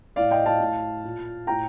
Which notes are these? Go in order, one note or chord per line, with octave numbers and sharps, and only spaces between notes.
A2 D5 F5
D#5 G5
F5 A5
A2
A#2
A2 G5 A#5